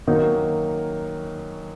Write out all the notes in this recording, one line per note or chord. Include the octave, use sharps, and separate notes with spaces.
F#2 D#3 A#3 D#4 F#4